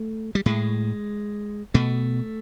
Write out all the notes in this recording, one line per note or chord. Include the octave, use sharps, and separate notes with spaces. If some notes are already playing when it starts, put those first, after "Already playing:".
Already playing: A3
G3
A2 G#3
B2 A3